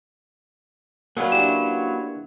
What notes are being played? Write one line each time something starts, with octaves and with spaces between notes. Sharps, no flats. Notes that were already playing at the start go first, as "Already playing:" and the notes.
F#3 A#3 C#4 F4 B4
D4 E4 G4 E7